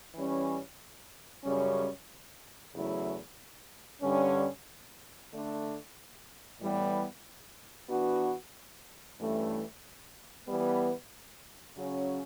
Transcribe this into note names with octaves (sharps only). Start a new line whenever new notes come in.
E3 G3 C#4
F#2 C#3 G3 C#4
E2 C#3 F#3 A3 E4
G2 D3 G3 C#4
D3 A3 D4
A2 E3 G3 B3
E3 B3 D4 F#4
G2 E3 A3 C#4
E3 G3 B3
C#3 F#3 C#4